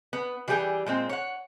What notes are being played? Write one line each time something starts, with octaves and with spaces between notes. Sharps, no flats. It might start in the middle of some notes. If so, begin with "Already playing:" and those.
B3
E3 G3 G4 G#4 G5
A#2 G#3 C4
C#5 F#5